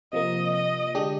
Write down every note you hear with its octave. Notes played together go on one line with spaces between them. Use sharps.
C3 F3 A#3 D#5
D#5
D3 G#3 D4 G4